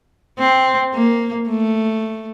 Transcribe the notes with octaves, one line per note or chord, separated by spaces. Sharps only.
C4
A#3
A3